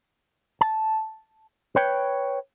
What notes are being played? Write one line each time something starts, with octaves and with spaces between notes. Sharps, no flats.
A5
B4 C#5 G5